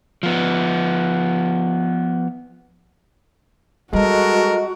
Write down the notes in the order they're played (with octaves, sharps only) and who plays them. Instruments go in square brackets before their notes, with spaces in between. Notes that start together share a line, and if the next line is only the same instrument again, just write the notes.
[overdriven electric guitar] F3 B3
[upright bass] G3 [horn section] G#3 A4 A#4 [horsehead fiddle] F#4 [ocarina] D#5